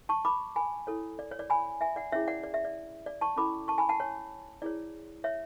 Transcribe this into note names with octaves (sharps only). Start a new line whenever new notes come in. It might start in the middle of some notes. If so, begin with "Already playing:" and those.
A5 C#6
B5 D6
G#5 B5
E4 A4 C#5
D5
C#5
D5
G#5 B5
E5 G#5
D5 F#5
C#4 E4 G#4 C#5 E5
D5 F#5
D5
E5
D5
D5
A5 C#6
C#4 E4 A4 B5 D6
A5 C#6
G#5 B5
F#5 A5
C#5
E4 G#4 C#5 D5
C#5 E5